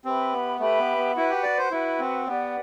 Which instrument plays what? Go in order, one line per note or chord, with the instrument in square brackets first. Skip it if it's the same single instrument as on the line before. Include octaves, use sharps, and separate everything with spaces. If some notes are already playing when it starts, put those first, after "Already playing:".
[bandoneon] C4 [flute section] G4 B4 E5 B5
[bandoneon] B3
[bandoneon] A3 [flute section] G4 B4 E5 B5
[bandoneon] B3
B3
[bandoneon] E4 [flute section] F#4 B4 F#5
[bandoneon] G4
D5
C5
[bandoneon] E4 [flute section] F#4 B4 F#5
[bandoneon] C4
[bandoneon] B3 [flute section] G4 B4 D5 F#5